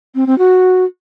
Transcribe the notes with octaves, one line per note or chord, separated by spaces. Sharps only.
C4
C4
F#4